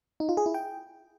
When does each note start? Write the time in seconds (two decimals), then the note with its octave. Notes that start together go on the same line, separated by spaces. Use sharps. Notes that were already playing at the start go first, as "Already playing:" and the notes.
0.20 D#4
0.29 F4
0.37 G#4
0.46 E4
0.54 G5